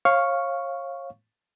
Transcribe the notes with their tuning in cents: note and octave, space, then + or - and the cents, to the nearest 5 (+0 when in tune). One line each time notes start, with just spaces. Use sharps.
C#5 -30 F5 +0 C#6 +0